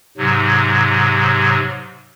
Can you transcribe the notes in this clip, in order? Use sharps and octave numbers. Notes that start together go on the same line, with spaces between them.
G#2 C3 F#3